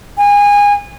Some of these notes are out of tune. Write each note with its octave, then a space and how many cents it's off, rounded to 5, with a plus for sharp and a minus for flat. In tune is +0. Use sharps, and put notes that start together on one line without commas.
G#5 -25